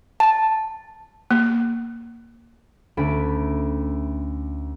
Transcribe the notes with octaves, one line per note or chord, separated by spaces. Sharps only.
A5
A#3
D2 A3 C#4 B5 D7